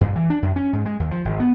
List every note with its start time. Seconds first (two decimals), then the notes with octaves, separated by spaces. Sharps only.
0.01 G2
0.16 E3
0.30 D4
0.42 F#2
0.56 C#4
0.73 G#2
0.85 G#3
1.00 D#2
1.11 F3
1.25 G#1
1.40 B3